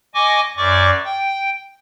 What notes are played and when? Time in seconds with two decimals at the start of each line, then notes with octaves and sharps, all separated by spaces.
0.14 D#5 G#5 C#6 D6
0.57 F#2 D5 C#6 D6
1.04 G5